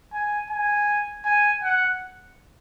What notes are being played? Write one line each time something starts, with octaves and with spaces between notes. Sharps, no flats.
G#5
G#5
G#5
F#5